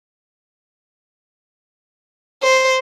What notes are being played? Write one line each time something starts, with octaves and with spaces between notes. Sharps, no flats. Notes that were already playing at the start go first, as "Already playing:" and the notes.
C5